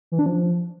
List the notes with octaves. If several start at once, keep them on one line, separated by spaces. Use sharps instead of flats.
E3
D4
F3